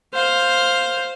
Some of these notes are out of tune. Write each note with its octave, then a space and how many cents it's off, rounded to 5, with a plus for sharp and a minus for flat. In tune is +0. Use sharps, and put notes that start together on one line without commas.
C5 +0 F5 +0